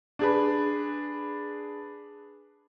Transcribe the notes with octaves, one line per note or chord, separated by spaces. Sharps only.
D4 G#4 B4